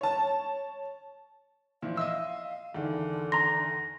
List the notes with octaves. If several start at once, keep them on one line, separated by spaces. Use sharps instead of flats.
C#5 A5
A#2 E3 F3 F5
D#5 E5 C6 E6
E2 D3 D#3
A#5 C6 A#6